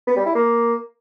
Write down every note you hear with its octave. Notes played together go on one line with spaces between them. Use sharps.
B3
G3
E4
A#3